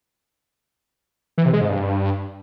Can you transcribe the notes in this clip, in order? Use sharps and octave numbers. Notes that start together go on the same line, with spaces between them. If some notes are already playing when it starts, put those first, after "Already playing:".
E3
C3
G#3
G#2
G2